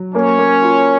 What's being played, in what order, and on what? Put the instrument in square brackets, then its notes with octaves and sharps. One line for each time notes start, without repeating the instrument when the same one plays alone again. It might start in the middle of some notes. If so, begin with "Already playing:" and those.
Already playing: [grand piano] F#3
[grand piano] A#3 [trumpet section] C#4 C#5
[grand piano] A#3
F4